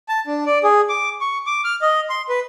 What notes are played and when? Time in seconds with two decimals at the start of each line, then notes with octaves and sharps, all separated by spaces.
0.09 A5
0.27 D4
0.46 D5
0.64 G#4
0.89 D6
1.21 C#6
1.47 D6
1.65 F6
1.82 D#5
2.10 C6
2.29 B4